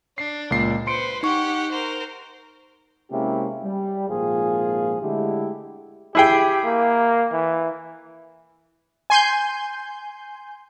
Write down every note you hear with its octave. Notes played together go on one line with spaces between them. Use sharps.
D4 C7
C#2 A#2 C7
B4 C5 C6 C#7 D7
D#4 G4 F#5 C#6
A#4 C5
C3 G#3 A#3 C#4 E4 G4
G3
G#1 A#2 F3 F4 G#4
D3 G#3 A3 E4 G4
E4 G4 G#4 G5
A#3
E3
G#5 C6 G6